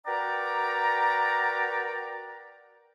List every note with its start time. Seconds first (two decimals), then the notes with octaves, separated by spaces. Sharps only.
0.07 F#4 A#4 B4 D5 G5 A#5